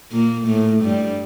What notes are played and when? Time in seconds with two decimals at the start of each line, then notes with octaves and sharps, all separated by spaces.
0.11 A#2 A#3
0.47 A2 A3
0.83 G2 G3